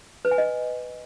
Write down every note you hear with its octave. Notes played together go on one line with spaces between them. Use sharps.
B4
G#5
D#5